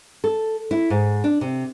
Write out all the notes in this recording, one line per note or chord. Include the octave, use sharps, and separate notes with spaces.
A4
E4
G#2
D4
C3